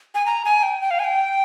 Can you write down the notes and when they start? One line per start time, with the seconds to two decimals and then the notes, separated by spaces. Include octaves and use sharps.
0.15 G#5
0.26 A#5
0.45 G#5
0.63 G5
0.81 G5
0.91 F5
0.99 G#5
1.04 G5